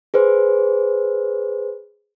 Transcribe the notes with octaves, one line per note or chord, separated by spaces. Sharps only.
G#4 B4 C5